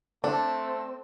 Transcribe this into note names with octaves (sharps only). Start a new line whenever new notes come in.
A3 C4 D4 A4